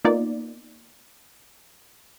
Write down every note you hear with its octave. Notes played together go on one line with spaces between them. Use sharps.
A#3 B3 D#4 F4 D5